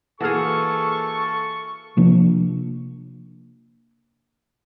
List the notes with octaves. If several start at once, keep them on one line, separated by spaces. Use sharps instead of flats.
E3 A#3 F#4 G#4 A4 C#6 F6
C3 F3 A#3 D4